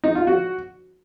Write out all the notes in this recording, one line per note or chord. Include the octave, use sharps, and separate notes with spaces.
D#4
F4
F#4